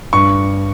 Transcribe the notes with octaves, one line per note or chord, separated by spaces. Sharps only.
G2 C#6